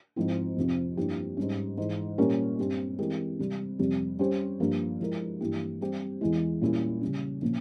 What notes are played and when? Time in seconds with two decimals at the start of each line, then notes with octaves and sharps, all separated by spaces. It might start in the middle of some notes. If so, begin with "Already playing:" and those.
0.16 G#2 F3 C4 E4
0.57 F2 C3 F3 C4
0.97 G2 F3 A#3 E4 G4
1.37 G#2 G3 C#4
1.78 G#2 E3 G#3
2.18 A#2 G3 C#4 G4 A#4
2.59 G2 G3 C4
2.99 E3 G#3 C4 G4 A#4
3.39 C3 G3 C4
3.79 F2 C3 G3
4.19 G3 C#4 G4 C5
4.60 G2 F3 A#3
5.00 F3 G#3 E4 A#4
5.41 G2 E3 A#3 E4 G4
5.81 G3 C4 G4 C5
6.21 E2 E3 G#3 E4
6.61 A#2 G3 C#4 E4
7.01 C#3 G3 C#4
7.42 A#2 F3 A#3 C#4